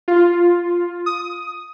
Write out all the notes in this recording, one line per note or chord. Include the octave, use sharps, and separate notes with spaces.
F4
D#6